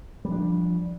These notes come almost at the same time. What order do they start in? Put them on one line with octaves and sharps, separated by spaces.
G3 F3 D4